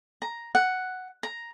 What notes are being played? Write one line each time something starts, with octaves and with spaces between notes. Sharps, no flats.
A#5
F#5
A#5